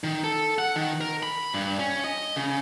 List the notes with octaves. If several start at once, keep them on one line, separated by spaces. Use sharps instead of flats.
D#3
A4
F#5
D#3
A#4
B5
G2
C#4
D#5
C#3